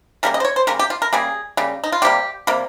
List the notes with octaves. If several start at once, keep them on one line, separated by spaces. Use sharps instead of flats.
C#3 G3 A#3 A#4
D#5
C5
C#5
C5
C#3 G3 A#3 A#4
G4
F4
A#4
C#3 G3 A#3 G#4
C#3 G3 A#3
D#4
F4
C3 G3 A#3 G4
C3 G3 A#3